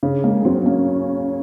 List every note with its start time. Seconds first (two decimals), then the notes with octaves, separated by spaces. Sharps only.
0.03 C#3
0.24 G#3 A#3
0.45 F#3 C4
0.62 C4
0.66 A#3 C#4